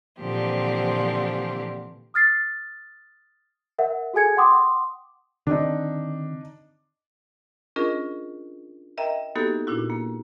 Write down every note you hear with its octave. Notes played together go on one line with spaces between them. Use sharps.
A#2 D3 E3 F3 C4 G4
D#6 F6 A6 C7
A#4 E5 F#5
F#4 G#4 A4 G#5 G#6 C#7
F#5 G5 C6 D6 D#6
D3 D#3 C4 D4 D#4
C#4 D4 F4 G#4 A#4 D#5
A#4 D#5 E5 G5 A#5
A#3 B3 D#4 F#4 G4 A4
A#2 D4 E4 F#4
A#3